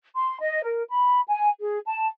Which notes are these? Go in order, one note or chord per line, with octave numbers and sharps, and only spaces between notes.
C6
D#5
A#4
B5
G#5
G#4
A5